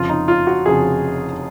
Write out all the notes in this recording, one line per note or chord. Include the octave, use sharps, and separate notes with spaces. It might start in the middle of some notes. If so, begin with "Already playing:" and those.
Already playing: F1 F2 C#3 F4
D#4
F4
F#4
F1 F2 C#3 G#4